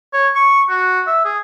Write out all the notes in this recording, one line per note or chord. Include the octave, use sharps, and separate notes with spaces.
C#5
C#6
F#4
E5
G#4